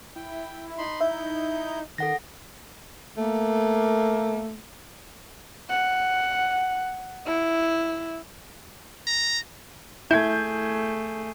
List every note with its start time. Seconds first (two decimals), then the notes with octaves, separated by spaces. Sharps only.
0.16 E4 G5
0.78 D#4 B5 C6
1.01 D#4 E4 E5 G6
1.98 D#3 A4 F#5 A#6
3.16 A3 A#3
5.70 F#5
7.26 E4
9.07 A#5
10.11 A3 E4 G#4 G6 G#6